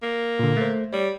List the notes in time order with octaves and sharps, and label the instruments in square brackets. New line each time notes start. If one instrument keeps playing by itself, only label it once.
[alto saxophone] A#3
[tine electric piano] A#2 D3
A3 C5
[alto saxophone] G3 [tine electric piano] C#5